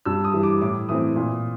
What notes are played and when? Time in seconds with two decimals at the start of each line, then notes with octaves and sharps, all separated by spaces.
0.06 G2 E6
0.24 D#6
0.33 E3 G3
0.43 D6
0.61 A2 D6
0.89 E3 A3 C4 D#6
1.16 A#2